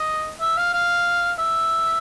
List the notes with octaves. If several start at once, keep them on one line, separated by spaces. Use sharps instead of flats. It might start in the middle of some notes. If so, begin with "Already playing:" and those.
Already playing: D#5
E5
F5
F5
E5